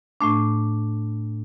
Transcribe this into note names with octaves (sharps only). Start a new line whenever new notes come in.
A2 A3 D4